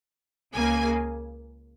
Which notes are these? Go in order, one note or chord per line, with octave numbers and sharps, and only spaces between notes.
C#2 C#3 A#3 G#5